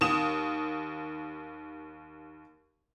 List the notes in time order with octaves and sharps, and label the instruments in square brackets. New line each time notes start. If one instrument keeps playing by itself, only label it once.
[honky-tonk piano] D#2 D#6 E7